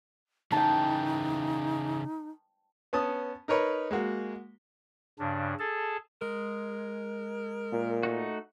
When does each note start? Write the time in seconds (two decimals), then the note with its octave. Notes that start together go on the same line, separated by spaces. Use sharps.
0.52 C#3 E3 D#4 G5 A5
2.93 B3 C#4 A5 D#6
3.48 D#4 A#4 B4 C#5
3.91 G#3 A#3 F#4
5.19 G2 C#3 D4
5.59 G#4 A4 A5
6.22 G#3 A#4
7.73 A#2
8.03 A3 D#4 F#4